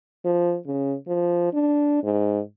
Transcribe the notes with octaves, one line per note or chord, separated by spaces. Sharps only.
F3
C#3
F3
D4
G#2